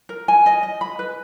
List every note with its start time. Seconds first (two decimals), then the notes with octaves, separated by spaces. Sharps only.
0.09 A#4
0.28 G#5
0.46 D#5
0.63 D#5
0.81 B5
0.99 B4